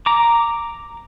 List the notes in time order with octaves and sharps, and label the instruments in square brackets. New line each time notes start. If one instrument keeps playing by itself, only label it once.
[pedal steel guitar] A#5 D6